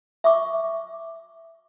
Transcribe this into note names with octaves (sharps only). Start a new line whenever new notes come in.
E5 C#6 D6